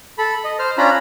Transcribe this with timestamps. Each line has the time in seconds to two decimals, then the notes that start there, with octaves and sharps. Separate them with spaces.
0.18 A4 B5
0.44 D#5
0.59 C5 F6
0.78 C#4 D4 F4 A#5 B5